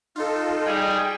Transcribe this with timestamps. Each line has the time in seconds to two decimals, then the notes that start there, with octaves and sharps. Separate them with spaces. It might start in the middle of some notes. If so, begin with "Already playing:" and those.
0.16 D#4 F4 A4
0.66 G3 G#4 G5